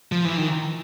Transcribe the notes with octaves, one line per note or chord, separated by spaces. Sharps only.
F3
E3
D#3